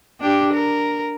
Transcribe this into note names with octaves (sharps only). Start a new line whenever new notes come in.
D4 G4
A#4